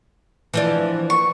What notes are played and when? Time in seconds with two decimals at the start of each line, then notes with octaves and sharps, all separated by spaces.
0.54 E3 F3 D4
1.10 C#6